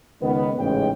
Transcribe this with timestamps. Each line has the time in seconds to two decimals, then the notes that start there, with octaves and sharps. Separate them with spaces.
0.21 C#2 D#3 B3
0.59 A1 G#2 C#3 G5